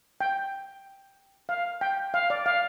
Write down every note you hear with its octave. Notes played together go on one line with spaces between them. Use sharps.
G5
F5
G5
F5
D5
F5